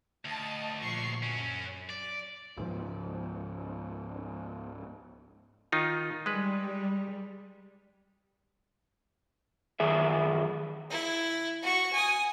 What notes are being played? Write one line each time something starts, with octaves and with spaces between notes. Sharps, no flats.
D2 D#5 A5
A#1 C#6 C7
F#2 F#3 C#4
D5
C#2 G#2 F3
D#3 D#4 F4
G3 G#3 B4
F#2 D#3 G#4 E5
E4
F#4 C#6
G#5 D#6